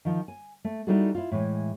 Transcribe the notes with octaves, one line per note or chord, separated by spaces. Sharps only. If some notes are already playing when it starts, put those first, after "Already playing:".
D#3 F3
G#5
A3
G3 D#4 E4 F#4 G#4 A4
E4 F4
A2 E3 G#3